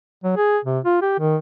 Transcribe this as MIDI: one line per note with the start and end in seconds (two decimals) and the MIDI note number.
0.24 0.35 54
0.37 0.59 68
0.65 0.79 48
0.85 0.98 65
1.02 1.18 67
1.19 1.36 51